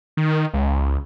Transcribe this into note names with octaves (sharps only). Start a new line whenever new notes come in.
D#3
C#2